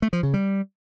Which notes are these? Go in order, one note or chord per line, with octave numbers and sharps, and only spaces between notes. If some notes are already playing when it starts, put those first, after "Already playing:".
A3
F3
C#3
G3